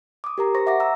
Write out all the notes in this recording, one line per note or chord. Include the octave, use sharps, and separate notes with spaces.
D6 D#6
G4 A#4 A#5
C5 C#6 A#6
E5 F#5 D6 A#6
A#5 E6